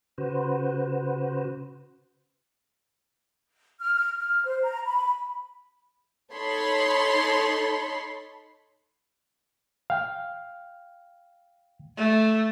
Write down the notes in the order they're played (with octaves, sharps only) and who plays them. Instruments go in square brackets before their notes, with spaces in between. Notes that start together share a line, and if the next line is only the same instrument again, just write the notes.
[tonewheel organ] C#3 F#4 B4 C5
[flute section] F6
F6
F6
C5
A#5
B5
[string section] D#4 A4 C#5 A5 B5 C6
[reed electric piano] F5 G5
[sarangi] A3